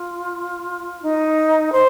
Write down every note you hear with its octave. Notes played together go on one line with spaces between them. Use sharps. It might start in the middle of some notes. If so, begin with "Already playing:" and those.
Already playing: F4
D#4
C5